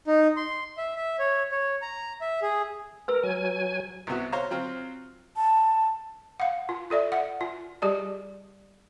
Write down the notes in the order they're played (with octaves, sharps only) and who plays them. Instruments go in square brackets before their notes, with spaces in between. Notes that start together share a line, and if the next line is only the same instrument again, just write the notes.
[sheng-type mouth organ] D#4
C6
E5
E5
C#5
C#5
A#5
E5
G#4
[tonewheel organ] A#4 [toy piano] B4 E6
[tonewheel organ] F#3 G#5
[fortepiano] C2 C3 B3 F#4
C5 C#5 F5 A#5
F#3 C4 F4 C5
[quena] A5
[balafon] F5 F#5
F4
F4 A4 D5 E5
E5 F#5
F4
G3 G4 G#4 D5